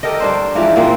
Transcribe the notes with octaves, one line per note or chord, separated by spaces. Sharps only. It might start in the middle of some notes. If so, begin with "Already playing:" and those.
G4 A4 A#4 D#5
G2 D4 C5
G#2 E3 F3 G4
A#2 A#3 C4